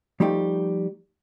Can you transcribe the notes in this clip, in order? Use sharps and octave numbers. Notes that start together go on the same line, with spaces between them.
F3 G3 A3 D#4 G4